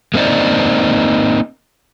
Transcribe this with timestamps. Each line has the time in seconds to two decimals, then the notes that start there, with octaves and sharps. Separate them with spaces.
0.14 G#3 A#3 C4 D#4 C5 D5